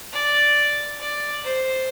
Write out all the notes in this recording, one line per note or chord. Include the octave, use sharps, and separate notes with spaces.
D5
D5
C5